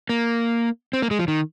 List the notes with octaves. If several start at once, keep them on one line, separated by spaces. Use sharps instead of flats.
A#3
C4
A#3
G#3
F3
D#3